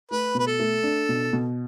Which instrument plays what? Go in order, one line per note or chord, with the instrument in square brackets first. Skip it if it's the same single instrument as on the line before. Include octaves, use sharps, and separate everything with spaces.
[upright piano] A3 [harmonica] B4
[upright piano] B2 [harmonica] B4
[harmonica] A4
[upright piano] A3
D4
B2
B2